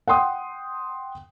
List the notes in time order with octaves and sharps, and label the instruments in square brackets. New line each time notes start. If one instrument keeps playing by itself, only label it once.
[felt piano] F#5 G5 C6 D#6